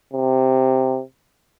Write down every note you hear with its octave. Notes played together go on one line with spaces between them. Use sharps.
C3